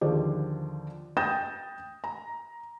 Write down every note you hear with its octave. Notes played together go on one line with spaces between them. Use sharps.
D#2 D3 F3 G#4 C5 D5
G5 D#6 G6 A6 A#6 E7
A#5